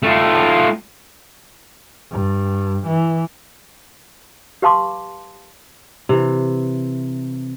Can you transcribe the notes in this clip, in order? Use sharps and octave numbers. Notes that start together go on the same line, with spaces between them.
A3 F4
G2
E3
G4 B4 F5 A5 C6 D6
C3 E3